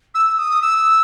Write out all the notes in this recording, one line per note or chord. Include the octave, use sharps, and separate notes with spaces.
E6
D#6
E6